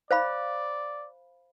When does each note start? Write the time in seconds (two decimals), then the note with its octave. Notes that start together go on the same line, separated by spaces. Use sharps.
0.11 C5 D5 F5 B5